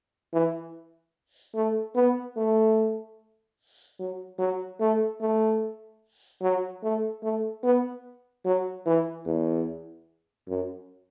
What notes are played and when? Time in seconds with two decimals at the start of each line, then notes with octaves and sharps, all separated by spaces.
0.33 E3
1.55 A3
1.95 B3
2.37 A3
3.99 F#3
4.39 F#3
4.80 A3
5.21 A3
6.42 F#3
6.83 A3
7.23 A3
7.64 B3
8.45 F#3
8.86 E3
9.26 E2
10.48 F#2